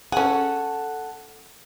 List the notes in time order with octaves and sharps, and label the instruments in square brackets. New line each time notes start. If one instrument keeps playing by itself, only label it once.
[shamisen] C#4 G#4 [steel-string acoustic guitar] A4 F#5